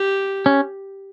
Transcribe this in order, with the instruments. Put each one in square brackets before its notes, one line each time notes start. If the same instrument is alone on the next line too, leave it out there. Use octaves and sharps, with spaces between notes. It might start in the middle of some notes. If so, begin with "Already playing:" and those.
Already playing: [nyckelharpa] G4
[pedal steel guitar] C#4